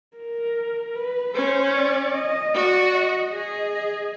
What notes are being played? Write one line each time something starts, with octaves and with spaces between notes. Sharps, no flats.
A#4
B4
C#4 C5
D5
D#5
F#4 D5
D#5
G#4 D#5